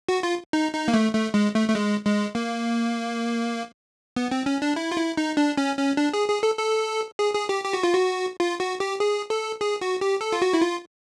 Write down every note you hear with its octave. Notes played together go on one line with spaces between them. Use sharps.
F#4
F4
D#4
D#4
A#3
A3
A3
G#3
A3
A3
G#3
G#3
A#3
B3
C4
C#4
D4
E4
F4
E4
D#4
D4
C#4
C#4
D4
G#4
G#4
A4
A4
G#4
G#4
G4
G4
F#4
F4
F#4
F4
F#4
G4
G#4
A4
G#4
F#4
G4
A4
F4
F#4
E4
F4